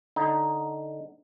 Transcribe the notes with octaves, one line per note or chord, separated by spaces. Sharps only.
D3 D#4